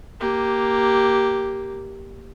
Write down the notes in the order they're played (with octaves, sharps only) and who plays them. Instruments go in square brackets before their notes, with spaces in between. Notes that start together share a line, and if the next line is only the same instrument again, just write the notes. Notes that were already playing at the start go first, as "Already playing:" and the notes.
[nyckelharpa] A#3 G4